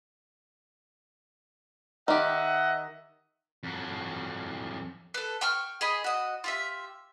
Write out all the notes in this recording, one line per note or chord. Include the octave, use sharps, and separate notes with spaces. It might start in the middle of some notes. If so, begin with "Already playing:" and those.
D#3 G4 D#5 E5 F#5
F2 F#3
A4 B4
G5 C#6 F6
G#4 D#5 B5
F#4 D#5
F4 G4 E5